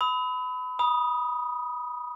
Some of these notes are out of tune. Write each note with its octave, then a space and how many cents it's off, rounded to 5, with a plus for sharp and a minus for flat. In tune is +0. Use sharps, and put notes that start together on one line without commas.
B5 +25 D#6 +45
B5 -25 D#6 +5